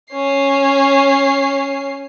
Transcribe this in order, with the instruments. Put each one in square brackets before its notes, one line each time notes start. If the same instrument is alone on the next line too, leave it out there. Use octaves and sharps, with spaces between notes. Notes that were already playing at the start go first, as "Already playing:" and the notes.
[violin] C#4 C7